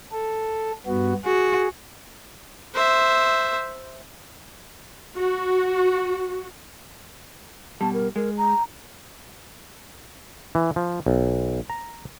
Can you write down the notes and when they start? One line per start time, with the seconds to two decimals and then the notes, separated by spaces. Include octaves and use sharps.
0.12 A4
0.86 G2 B3 F#4
1.25 F#4 G#4
2.75 C5 E5
5.15 F#4
7.81 B2 G3 A5
7.93 A#4
8.16 G#3 A#4
8.38 A#5
10.55 E3
10.76 F3
11.06 B1
11.70 A#5